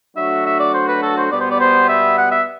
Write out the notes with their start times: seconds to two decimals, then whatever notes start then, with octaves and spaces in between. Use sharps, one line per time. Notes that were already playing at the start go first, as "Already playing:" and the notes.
0.16 F#3 A3 D4 F#4 E5
0.45 E5
0.59 D5
0.74 C5
0.88 B4
1.02 A4
1.18 C5
1.31 B2 G3 B3 D5
1.40 C5
1.50 D5
1.60 C5
1.89 E5
2.18 F#5
2.31 E5